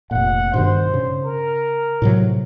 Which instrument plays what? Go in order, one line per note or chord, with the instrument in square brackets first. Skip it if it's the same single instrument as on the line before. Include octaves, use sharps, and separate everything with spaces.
[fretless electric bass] F1 A#2 [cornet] F#5
[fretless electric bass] G2 B2 D#3 [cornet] C5
[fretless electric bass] C#3
[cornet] A#4
[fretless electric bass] A2 C3 F#3